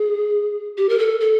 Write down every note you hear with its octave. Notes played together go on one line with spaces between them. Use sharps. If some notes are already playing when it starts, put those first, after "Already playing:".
Already playing: G#4
G4
A#4
A4
A4